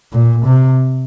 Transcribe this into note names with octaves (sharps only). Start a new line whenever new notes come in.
A#2
C3